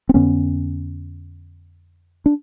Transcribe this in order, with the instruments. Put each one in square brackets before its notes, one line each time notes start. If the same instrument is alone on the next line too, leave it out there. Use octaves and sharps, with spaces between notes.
[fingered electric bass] C4
F2 D3 B3 C#4
D4